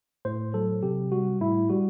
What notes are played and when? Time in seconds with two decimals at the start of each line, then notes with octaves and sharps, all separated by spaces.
0.25 A2 C5
0.54 F#3 A4
0.83 C3 G4
1.12 G3 F#4
1.41 A2 E4
1.70 G3 F#4